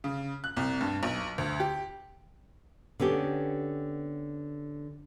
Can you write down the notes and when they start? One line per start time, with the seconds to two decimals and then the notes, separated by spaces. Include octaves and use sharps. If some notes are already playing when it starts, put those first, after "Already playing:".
0.04 C#3
0.44 F#6
0.57 C2
0.81 G2
1.03 B1
1.38 D2
1.60 G4
3.00 D3 B3 C#4 G4